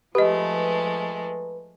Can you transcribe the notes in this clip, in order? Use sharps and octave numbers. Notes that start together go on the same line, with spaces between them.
F3 G#3 A3 G4 B4 D#5